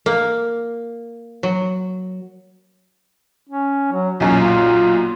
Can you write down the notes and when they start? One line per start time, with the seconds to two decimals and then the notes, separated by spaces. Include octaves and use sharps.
0.06 A#3
1.43 F#3
3.50 C#4
3.92 F#3
4.20 B1 F#2 A#2 C#4
4.40 F4